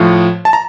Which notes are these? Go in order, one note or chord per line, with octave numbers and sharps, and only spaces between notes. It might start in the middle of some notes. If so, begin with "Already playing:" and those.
Already playing: A2 F3
A5
A#5